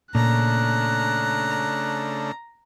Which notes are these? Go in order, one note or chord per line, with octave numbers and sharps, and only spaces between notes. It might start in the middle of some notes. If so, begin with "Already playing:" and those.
A#2 C#3 A3 D4 A#5 F#6